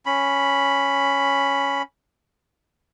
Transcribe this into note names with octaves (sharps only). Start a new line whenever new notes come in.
C#4 B5